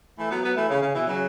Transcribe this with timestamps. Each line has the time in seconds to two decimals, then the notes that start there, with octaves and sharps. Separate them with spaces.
0.18 E3 A3
0.30 F#3 B3
0.43 F#3 B3
0.56 E3 A3
0.69 C#3
0.82 C#3
0.95 B2 E3
1.07 C#3 F#3